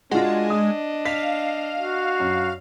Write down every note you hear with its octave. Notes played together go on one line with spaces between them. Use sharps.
G#3 D4 F4 F#4 D#5
D#6
F5 B6
F#4
F#2